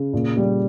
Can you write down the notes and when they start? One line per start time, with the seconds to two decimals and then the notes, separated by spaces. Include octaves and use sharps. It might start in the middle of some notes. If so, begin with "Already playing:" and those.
Already playing: C#3
0.13 A#2
0.37 G3